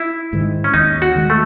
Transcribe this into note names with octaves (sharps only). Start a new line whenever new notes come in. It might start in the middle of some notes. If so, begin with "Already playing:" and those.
Already playing: E4
G#2 D#3
C#4
D#2 D#4
F#4
D#3 G#3
A3